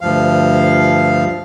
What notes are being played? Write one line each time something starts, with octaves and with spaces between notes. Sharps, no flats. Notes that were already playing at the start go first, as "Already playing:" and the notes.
D2 G2 F3 F5